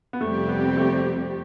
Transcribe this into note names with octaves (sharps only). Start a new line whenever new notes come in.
B3
F2 C3 G3 A3 C4 G4
B3
A3